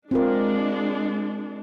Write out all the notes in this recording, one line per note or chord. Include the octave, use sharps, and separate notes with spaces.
G#3 C4 D4 F4 A#4